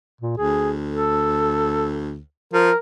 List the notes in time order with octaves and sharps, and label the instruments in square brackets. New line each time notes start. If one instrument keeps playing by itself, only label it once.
[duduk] A#2
[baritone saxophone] D2 [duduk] G#4
[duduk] A4
[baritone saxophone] F3 [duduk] A#4